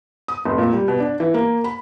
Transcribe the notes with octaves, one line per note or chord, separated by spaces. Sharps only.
D#6
F1
A#2
G3
B2
D4
E3
A#3
B5